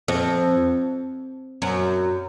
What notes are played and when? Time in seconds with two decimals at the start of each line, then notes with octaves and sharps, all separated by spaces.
0.08 F2
1.62 F#2